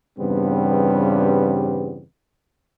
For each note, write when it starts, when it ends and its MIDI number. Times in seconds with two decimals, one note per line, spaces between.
0.19 2.03 40
0.19 2.03 43
0.19 2.03 49
0.19 2.03 55
0.19 2.03 59
0.19 2.03 60